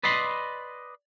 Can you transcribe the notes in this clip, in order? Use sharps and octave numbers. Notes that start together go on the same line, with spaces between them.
B4 D5 D#5 B5 C6